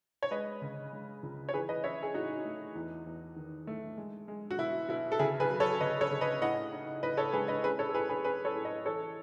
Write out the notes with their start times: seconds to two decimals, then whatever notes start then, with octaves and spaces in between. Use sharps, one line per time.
0.23 C#5
0.31 G#3 B4 D#5
0.62 C#3
0.93 G#3
1.23 C#2
1.49 C#5
1.54 E3 G#4 B4
1.69 B4 D#5
1.84 C#4 C#5 E5
2.03 G#4
2.14 A2 D#4 F#4
2.45 A3
2.75 E2
3.06 E2
3.36 D#3
3.67 A3
3.97 G#3
4.28 G#3
4.51 F#4
4.58 B2 E4
4.89 B2 E4
5.12 A4
5.19 C#3 E4 G#4
5.40 G#4 B4
5.50 F#3
5.60 A4 C#5
5.80 C#3 B4 D#5
6.01 A4 C#5
6.11 C#3
6.21 B4 D#5
6.42 A2 D#5 F#5
6.72 D#4
7.03 A2 B4 D#5
7.17 A4 C#5
7.33 G#3 G#4 B4
7.48 B4 D#5
7.63 C#4 G#4 B4
7.79 A4 C#5
7.89 A4
7.94 A2 G#4 B4
8.09 G#4 B4
8.24 C#4 G#4 B4
8.45 A4 C#5
8.55 A2
8.65 B4 D#5
8.85 E3 A4 C#5